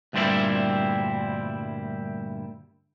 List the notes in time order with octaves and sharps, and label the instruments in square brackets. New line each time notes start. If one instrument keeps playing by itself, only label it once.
[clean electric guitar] D2 G2 A#2 G3 C4 E4